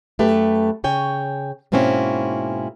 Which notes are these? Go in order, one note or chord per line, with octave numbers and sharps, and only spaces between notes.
F#2 A3 G4 B4
C#3 C#5 G5 G#5
G#2 B2 A#3 C4 C#4 E4